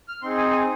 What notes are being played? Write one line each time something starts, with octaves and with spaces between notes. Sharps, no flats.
F6
C4 D#4 G#4 C6
G#5
G#5